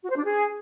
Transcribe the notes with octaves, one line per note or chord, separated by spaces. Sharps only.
F#4
C5
D4
G#4